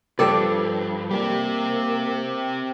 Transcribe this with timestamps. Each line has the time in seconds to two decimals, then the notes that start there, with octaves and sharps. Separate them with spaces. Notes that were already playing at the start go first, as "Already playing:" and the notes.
0.19 G2 F3 G4 A4 D5
1.11 G3 A#3 C4 G4